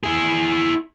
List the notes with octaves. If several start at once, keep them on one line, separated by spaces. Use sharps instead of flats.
E4 G#4